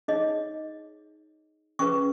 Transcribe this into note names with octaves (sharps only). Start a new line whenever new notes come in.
D#4 G#4 C#5 D#5
C#4 G#4 B4 C#6